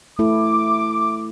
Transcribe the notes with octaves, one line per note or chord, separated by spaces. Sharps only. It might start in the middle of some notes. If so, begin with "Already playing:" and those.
A3 E4 A4 D6